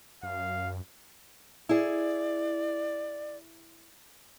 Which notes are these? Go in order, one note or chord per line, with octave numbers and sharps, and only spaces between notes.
F#2 F5
E4 G#4 D5